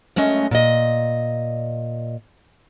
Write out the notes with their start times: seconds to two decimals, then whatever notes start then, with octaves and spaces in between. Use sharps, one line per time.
0.16 F#2 G#3 A3 C#4 D#5
0.51 A#2 D#5